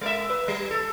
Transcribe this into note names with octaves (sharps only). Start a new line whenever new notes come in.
G#3 A#3 E5
B4
G3
A4